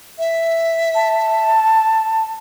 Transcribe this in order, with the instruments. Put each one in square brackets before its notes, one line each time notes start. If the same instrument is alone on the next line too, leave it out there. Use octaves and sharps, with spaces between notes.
[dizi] E5
[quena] A5